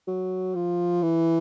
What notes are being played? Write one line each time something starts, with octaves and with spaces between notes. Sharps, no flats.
F#3
F3
E3